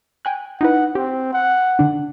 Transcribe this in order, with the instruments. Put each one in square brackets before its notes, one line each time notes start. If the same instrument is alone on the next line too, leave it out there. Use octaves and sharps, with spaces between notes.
[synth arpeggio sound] G5 G#5 F#6
[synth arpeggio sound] D#4 E4 B4 [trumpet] F#5
[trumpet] C4 [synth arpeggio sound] G4
[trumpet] F#5
[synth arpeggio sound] D3 D4